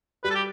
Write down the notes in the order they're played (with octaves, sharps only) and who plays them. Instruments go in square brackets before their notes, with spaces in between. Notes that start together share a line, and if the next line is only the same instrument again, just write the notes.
[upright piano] G3 [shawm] B4
[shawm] A4
G4